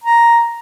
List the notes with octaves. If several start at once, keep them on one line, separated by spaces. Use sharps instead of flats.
A#5